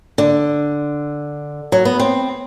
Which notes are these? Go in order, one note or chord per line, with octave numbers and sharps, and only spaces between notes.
D3
F#3
B3
C4